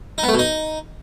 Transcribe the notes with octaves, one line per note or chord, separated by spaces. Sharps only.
D#4
B3
A3
B2
D#4